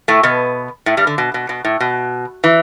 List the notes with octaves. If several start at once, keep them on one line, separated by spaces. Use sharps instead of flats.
A2 A3
B2 B3
A2 A3
G2 G3
D3
B2
B2
B2
A2
B2
E3